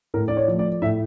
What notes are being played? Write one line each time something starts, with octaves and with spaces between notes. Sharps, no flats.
A2 A#4
D5
C#5
F3 A3
D5
A2 E5